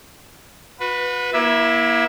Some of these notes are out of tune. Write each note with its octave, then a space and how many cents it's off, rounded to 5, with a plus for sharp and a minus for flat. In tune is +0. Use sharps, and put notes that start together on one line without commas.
F#4 -35 B4 +0
A#3 +35 E4 +0 E5 +0